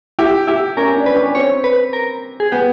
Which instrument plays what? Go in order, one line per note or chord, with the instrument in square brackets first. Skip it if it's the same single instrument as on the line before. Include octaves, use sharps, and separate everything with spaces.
[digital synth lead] E4 [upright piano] G4
[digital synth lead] E4 [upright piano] G4
[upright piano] C#4 [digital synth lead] A#4
[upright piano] D4
[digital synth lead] B4
[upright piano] C#4
[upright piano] C4 [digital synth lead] C#5
[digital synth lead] B4
A#4
G#4
[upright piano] B3 [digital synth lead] G4